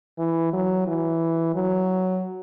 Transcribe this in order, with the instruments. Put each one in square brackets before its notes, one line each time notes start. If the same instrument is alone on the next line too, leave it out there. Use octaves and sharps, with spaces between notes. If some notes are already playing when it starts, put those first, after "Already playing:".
[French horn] E3
F#3
E3
F#3